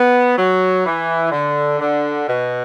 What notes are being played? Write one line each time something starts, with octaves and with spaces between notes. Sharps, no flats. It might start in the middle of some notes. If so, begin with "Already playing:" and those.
Already playing: B3
F#3
E3
D3
D3
B2